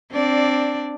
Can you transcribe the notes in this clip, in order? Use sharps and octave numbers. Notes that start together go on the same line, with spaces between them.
C4 D4 D5